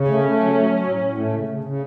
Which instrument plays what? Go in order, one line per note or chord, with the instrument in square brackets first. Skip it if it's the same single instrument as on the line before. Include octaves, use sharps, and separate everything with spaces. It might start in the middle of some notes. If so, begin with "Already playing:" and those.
Already playing: [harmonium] C#3 [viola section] C#4
[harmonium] A3
A3
F#3
F#3
F#3
A2
A2
A3
C#3
C#3
C#3